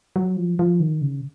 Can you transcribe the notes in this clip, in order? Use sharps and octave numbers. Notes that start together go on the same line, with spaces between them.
F#3
F3
F3
D#3
C#3